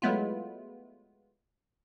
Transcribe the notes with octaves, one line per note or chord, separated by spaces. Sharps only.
F#3 G#3 A3 B3 E4 F4